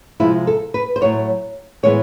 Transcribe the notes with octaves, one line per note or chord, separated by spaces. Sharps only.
C3 F3 G#3 E4
A4
B4
C5
A2 F#3 A3 C#5
A2 E3 G#3 B3 C#5